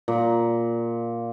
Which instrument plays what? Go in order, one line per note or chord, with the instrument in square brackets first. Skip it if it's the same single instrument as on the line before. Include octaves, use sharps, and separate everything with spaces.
[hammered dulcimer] A#2